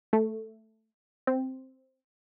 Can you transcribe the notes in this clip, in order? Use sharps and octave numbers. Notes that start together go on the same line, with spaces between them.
A3
C4